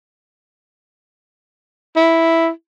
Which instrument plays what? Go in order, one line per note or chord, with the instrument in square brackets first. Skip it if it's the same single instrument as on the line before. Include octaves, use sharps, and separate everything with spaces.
[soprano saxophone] E4